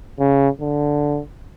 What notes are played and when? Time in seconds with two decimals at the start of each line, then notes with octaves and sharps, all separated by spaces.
0.19 C#3
0.61 D3